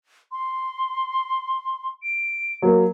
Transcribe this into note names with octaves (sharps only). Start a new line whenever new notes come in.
C6
D7
F#3 A#3